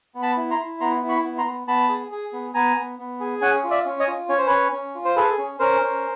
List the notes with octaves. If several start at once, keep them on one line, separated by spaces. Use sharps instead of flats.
B3
A5 B5
E4
A#5 C6
E4
B3 A#5 C6
E4
B5 C#6
B3
A#5 C6
B3
B3 A5 B5
G#4
G#4
B3
B3 G#5 A#5
B3
B3
G#4
C#4 F#5 G#5
F4
D5 E5
C#4
C#5 D#5
F4
C#4 C#5
C5
C#4 B4 C#5
C#4
F4
C5
G#4 A4 B4
C#4
C#4 A#4 C5
C#4